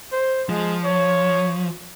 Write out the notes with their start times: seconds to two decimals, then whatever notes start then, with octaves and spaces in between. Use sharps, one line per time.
0.12 C5
0.49 F3 G#3
0.84 C#5